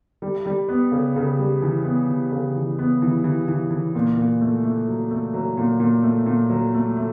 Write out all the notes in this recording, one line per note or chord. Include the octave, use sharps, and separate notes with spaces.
G3
G3
B3
C#3
C#3
G3
E3
B3
E3
C#3
E3
B3
E3
E3
E3
E3
A#2
A#2
A3
A3
F#3
A3
F#3
A#2
A#2
A3
A#2
F#3
A3
A3